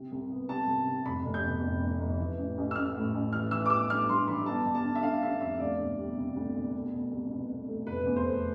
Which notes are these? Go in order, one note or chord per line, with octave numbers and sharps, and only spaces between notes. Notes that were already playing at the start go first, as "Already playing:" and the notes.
Already playing: C3
C2
B3
C3 A5
C2
C3
F1 B5
F1
G6
B2
F1
F1
F1
E3
A1
A1
E6
A1 F6
A2
A1
E3 F6
E3 E6
D6
B3 E6
G2 F6
G2 C6
E3 B5
G1 A5
G1
A5
D3
E5
D3 F5
D3 E5
F2 E5
D2 D5
E1
G3
C3
D2
E1
A3
B2
C2
B2
B2
A3
F1 B4
E2
C5
A3